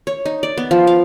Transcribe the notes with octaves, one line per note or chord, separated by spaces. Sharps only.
C#5
D#4
D5
B3
F3
F5